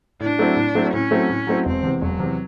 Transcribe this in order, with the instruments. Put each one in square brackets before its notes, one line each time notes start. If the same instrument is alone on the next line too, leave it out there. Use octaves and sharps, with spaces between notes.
[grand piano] A2 [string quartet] D4
[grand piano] F#3 A3 C4 E4
A2
F#3 A3 C4 E4
[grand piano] A2 [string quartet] C#4
[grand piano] F#3 A3 C4 E4
A2
F#3 A3 C4 E4
[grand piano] E1 [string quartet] C4
[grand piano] E2 C3
[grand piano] E1 [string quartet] F#3
[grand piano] E2 C3